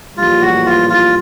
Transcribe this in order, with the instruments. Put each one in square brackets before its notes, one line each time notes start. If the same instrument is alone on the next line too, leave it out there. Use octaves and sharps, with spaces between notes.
[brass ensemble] A#1 A2 E3 G3 [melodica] F4
[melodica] F#4
F4
F4